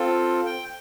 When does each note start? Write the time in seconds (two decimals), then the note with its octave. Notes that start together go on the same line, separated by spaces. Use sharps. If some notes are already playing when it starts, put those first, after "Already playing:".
Already playing: C4 F4 A4
0.46 G5